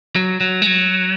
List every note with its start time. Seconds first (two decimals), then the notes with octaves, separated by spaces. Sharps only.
0.16 F#3
0.41 F#3
0.62 G#3
0.67 F#3